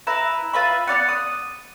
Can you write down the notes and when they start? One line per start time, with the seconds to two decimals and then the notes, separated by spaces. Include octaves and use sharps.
0.07 E4 B4 A#5
0.53 F4 B4 E5 B5
0.87 B3 C#4 D5 F#5
1.08 D#6